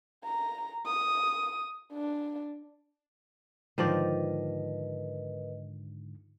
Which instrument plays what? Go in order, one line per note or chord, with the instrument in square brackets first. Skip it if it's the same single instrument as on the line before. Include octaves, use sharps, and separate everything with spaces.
[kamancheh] A#5
D#6
D4
[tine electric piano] G#2 D3 [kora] D#3 F3 D5 [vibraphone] A#4 B4 D#5